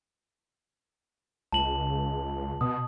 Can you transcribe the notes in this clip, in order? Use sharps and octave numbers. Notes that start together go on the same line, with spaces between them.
C#2 A5 F#7
B2 D#6